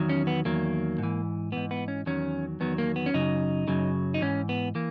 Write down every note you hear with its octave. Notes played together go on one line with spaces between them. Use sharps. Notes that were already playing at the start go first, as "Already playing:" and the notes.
Already playing: E2 D#3 F#3
C#4
B3
E2 D#3 F#3 A#3
G#2 E3
G#2 E3 B3
B3
C#4
E2 D#3 F#3 C#4
E2 D#3 F#3 B3
A#3
B3
C#4
F#2 C#3 F#3 D#4
F#2 C#3 F#3
D#4
G#2 E3 C#4
B3
E3 A#3